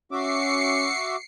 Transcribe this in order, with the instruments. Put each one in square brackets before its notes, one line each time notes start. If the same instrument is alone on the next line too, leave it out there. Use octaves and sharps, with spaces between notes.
[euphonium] C#4 [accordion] F#4 E5 D6 [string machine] C7 C#7